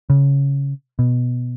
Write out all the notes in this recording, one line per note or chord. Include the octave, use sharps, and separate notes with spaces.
C#3
B2